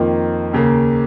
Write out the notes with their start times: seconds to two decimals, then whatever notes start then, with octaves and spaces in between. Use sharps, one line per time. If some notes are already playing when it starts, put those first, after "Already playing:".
Already playing: F2 D#3 A#3 F4
0.53 D#2 C#3 A#3